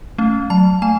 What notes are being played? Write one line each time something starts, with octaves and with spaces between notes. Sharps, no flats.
A3 C#4
F#3 A5
A3 G#5